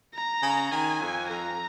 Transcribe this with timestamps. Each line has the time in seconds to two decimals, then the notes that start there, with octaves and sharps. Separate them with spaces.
0.14 A#5
0.42 C#3
0.72 D#3 G#5
1.01 F2
1.29 F2 A#5